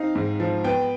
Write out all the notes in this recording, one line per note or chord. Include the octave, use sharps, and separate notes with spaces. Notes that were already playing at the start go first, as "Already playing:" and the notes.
Already playing: C4 D#4 F5
G#2
F3
B3 G5